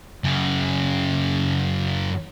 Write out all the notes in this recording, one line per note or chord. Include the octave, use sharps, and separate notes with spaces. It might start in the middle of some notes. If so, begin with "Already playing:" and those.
F#2 C#3